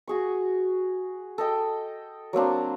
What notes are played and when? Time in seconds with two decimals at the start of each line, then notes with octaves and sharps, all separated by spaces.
0.07 F#4 G#4 C#6
1.38 A4 D#5 G5
2.33 F#3 A#3 C4 D4